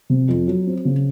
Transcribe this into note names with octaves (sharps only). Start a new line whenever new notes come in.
C3
F2
F#3
C4
C#3